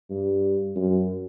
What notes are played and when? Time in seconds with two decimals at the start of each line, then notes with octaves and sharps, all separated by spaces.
0.10 G2
0.76 F#2